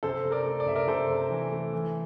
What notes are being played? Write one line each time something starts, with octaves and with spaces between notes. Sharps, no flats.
C3 A4 C5
C3
A#4 D5
A3
D5
C3 E5
A#4 D5
C3 A4 C5
C3
E3
A3
E3